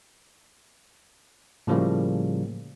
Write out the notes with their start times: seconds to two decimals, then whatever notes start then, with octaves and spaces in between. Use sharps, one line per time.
1.67 A2 C#3 F3 G3 A#3